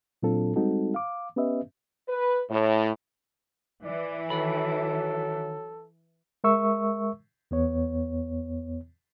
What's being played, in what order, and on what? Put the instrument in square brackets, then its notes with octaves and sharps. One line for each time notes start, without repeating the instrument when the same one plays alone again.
[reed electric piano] A#2 F#3 C4 D4 F4 A4
G3 G#3 C4 D#4 F#4 A4
F5 D6
B3 C#4 G4 B4 D#5 E5
[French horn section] B4
A2
[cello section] E3 [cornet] D5
[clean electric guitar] D#3 B5 [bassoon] F#3 [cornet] A4
[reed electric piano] G#3 A#4 E5 C#6 E6
E2 B3 C#5